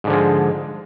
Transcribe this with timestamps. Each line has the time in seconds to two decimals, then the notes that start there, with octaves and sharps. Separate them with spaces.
0.04 G#2
0.07 D3
0.10 F3
0.13 G#3